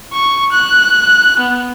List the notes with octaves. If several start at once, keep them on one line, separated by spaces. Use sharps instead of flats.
C#6
F#6
B3